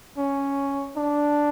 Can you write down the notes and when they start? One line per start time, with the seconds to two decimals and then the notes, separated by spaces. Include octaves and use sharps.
0.18 C#4
0.96 D4